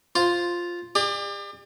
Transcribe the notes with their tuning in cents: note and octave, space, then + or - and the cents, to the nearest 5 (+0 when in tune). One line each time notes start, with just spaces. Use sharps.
F4 +0 C5 +0
G4 +45 D5 +30